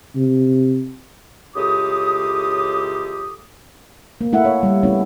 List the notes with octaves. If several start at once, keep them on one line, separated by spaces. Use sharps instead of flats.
C3
C#2 A2 G4 A4 D6 D#6
A#3
A3 E4 E5 F#5
C#5
G3
A3 B3 C#4 E4 C#5